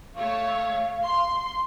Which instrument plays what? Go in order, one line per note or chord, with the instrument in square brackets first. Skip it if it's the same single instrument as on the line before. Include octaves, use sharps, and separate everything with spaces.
[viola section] A3 C#5 [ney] F5
[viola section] C6